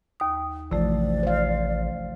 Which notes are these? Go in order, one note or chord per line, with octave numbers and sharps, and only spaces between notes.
D#2 D#6
A1 C3 E3 F3 A3 D5
C5 F5